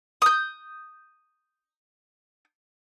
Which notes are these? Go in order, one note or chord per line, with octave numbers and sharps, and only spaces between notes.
D#6 G6